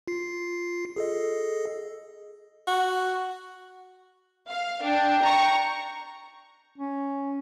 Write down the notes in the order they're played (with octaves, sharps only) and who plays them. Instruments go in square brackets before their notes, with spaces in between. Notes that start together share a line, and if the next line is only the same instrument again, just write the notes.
[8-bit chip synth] F4 C7
G#4 A4 D#5
[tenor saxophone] F#4
[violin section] F5
[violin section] D4 [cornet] G5
[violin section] A#5 C#6
[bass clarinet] C#4